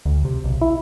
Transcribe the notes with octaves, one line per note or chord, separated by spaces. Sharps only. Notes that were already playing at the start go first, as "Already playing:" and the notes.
D2
C3
B1
E4